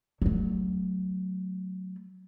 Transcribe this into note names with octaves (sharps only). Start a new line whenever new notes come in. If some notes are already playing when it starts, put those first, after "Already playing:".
F#3 A3